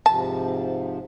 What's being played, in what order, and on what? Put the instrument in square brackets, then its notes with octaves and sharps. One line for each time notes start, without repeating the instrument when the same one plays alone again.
[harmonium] G#2 C3 F3 [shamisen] A5